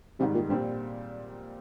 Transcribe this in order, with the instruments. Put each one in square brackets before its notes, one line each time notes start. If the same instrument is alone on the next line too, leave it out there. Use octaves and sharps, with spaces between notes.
[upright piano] G#2 D#3 G3 [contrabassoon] C3
[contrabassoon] A#2
[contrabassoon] G2 [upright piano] A#2 G3 C4 G4